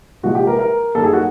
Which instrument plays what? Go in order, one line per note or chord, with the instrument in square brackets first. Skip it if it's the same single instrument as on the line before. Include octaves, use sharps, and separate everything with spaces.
[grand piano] C2 A#2 F3 G#3 F#4
G4
A#4
A#4
F#2 D#3 G3 A#3 A4
G#4
F#4